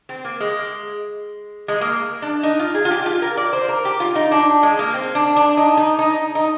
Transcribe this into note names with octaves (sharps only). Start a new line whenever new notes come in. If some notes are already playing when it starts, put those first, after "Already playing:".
C4
A#3
G#3
G#3
A#3
D4
D#4
F4
G#4
F4
G4
F4
A#4
D5
C5
A#4
G4
F4
D#4
D4
G#3
A#3
C4
D4
D4
D#4
D#4
D#4
D#4